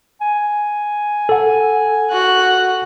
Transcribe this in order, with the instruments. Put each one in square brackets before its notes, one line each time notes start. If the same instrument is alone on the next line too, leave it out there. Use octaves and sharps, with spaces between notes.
[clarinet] G#5
[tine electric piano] A4 F#5
[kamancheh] F#4 F#6